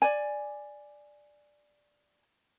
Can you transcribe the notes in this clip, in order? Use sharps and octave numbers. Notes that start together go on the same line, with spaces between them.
D5 G#5